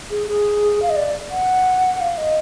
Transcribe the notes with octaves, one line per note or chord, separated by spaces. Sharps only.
G#4
G#4
F5
D#5
D5
F#5
F5
D#5